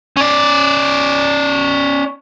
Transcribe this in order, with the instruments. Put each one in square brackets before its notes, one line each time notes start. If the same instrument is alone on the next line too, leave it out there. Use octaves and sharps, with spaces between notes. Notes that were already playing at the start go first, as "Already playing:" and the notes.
[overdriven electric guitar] C#4 D5